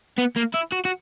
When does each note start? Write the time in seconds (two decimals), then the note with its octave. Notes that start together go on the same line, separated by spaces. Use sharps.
0.18 B3
0.36 A#3
0.54 E4
0.72 F#4
0.85 F#4